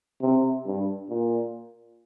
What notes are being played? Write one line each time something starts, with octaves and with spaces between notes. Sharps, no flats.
C3
G2
A#2